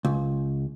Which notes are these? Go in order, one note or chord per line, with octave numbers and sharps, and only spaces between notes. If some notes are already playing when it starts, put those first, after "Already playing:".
C#2